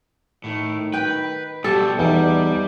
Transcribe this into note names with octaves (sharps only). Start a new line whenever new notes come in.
A2 D#3
B4 G5
B2 G3 G4 A4
E2 G3 D#4